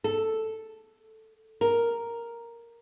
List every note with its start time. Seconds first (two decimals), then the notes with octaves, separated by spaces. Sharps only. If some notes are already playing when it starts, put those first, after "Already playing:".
0.04 A4
1.61 A#4